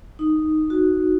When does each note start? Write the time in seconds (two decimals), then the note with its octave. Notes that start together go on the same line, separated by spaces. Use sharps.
0.19 D#4
0.70 F#4